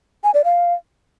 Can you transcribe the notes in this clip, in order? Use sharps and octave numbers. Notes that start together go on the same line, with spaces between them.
G#5
D5
F5